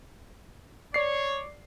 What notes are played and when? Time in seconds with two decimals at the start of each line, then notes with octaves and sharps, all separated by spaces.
0.94 C#5 D5 C7